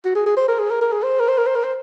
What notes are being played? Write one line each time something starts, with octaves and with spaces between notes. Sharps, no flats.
F#4
G#4
G#4
C5
A#4
G#4
A#4
A#4
G#4
C5
A#4
C5
A#4
C5
A#4
C5